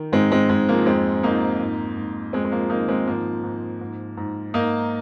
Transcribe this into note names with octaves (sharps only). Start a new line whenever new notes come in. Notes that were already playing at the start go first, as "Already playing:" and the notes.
Already playing: D#3
G#2 G#3 C4
G#3 C4
G#2 G#3
F3 A#3
F2 G#3 C4
F2 A#3 D#4
G#2
G#2
F2 G#3 C4
G#3
F3 A#3
D#3 A#3 D#4
G#3 C4
G#2 F3 A#3
G#2
G#2
G#2
G#2 A#3 D#4